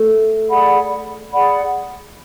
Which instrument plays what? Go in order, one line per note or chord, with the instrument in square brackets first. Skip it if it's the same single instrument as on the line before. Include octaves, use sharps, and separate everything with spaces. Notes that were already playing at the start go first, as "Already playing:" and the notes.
Already playing: [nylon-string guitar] A3
[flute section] G#4 D5 F#5 B5
G#4 D5 F#5 B5